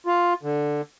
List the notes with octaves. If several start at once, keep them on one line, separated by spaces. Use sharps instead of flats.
F4
D3